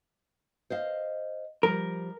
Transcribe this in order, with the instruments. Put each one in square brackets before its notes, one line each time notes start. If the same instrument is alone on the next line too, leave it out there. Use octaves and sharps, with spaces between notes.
[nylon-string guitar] C5 D#5 F5
[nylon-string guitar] F3 G3 [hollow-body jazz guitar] A#4